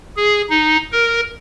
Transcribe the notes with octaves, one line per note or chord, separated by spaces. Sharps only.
G#4
D#4
A#4